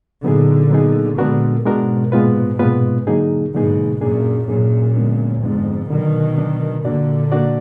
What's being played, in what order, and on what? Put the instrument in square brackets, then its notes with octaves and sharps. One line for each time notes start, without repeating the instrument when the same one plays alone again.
[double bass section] A#2 D3 [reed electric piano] F#3 B3 D#4 G#4
[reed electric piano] F#3 B3 D#4 G#4
[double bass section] A#2 D3 [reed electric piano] G#3 B3 D4 F#4 A#4
[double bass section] G#2 B2 [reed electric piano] G#3 B3 D4 F#4 A#4
[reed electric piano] A#2 G#3 B3 F4 B4
A#2 G#3 B3 F4 B4
D3 F#3 A#3 D#4 G#4
[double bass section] G#2 B2 [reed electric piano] D3 F#3 A#3 D#4 G#4
[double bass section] F#2 A#2 [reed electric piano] A#3 D4 G#4
[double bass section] F#2 A#2 [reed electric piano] A#3 D4 G#4
[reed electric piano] D3 G#3 B3 D4
[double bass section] F2 G#2 [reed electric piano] D3 G#3 B3 D4
[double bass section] B2 D#3 [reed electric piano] D3 F#3 D4
[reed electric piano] D3 F#3 D4
[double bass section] A#2 D3 [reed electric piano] A#3 D4 F#4 D5
[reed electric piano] A#3 D4 F#4 D5